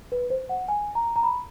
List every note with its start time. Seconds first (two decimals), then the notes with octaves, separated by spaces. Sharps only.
0.12 B4
0.30 C5
0.49 F#5
0.68 G#5
0.95 A#5
1.16 A#5
1.23 B5